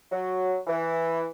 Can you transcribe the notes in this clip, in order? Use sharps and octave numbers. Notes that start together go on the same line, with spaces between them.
F#3
E3